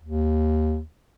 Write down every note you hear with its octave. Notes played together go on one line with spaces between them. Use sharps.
D#2